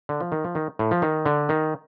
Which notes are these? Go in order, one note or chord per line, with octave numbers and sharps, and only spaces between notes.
D3
F3
D#3
F3
D#3
A2
F3
D#3
D3
D#3